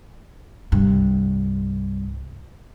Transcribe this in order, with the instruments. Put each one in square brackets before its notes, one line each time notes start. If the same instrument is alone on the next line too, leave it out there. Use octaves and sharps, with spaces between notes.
[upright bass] C2 G2